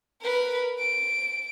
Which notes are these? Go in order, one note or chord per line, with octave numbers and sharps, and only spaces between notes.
A#4 B4
D7